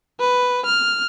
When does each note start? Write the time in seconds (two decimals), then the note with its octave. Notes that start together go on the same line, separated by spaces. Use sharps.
0.20 B4
0.65 F6